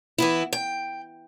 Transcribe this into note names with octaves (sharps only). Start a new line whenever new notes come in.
E3 B3 E4
G5